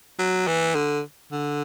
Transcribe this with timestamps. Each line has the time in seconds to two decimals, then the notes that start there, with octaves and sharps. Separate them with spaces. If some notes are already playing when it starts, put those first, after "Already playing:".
0.19 F#3
0.47 E3
0.75 D3
1.32 D3